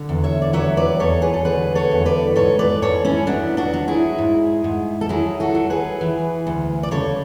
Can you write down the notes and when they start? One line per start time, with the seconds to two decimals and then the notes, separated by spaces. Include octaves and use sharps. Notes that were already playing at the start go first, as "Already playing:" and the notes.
Already playing: D3
0.09 E2
0.24 C#5 E5
0.42 D5
0.53 F#3 C#5 E5
0.77 B4 D5
1.00 E2 A4 C#5
1.22 G#4 B4
1.34 A4
1.45 D3 G#4 B4
1.75 A4 C#5
1.91 E2
2.06 B4 D5
2.35 G#2 A4 C#5
2.59 B4 D5
2.82 G#2 A4 C#5
3.05 C#4 E4
3.27 F#3 B3 D4
3.57 D4 F#4
3.73 F#3
3.88 E4 G#4
4.18 G#2
4.64 G#2
5.01 A4
5.09 F#3 E4 G#4
5.40 F#4 A4
5.55 F#3
5.70 G#4 B4
6.01 E3
6.47 D2
6.83 D5
6.91 C#3 A4 C#5